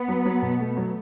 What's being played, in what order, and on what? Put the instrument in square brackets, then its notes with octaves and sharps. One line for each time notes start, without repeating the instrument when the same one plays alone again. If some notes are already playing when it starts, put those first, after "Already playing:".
Already playing: [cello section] B3
[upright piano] F#3
F#3
B2
A3
F#3